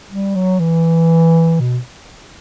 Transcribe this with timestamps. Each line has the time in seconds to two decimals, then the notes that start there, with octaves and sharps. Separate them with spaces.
0.10 G3
0.35 F#3
0.60 E3
1.60 B2